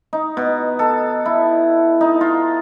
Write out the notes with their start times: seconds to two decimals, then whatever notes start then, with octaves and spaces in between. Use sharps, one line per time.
0.13 D#4
0.37 B2
0.79 A4
1.26 E4
2.01 D#4
2.21 F4